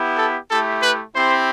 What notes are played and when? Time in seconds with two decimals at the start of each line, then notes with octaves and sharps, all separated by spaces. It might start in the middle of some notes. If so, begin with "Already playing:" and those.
Already playing: B3 E4 G4
0.17 A4
0.50 A3 E4 G4 A4
0.82 B4
1.13 C4 E4 G4 C5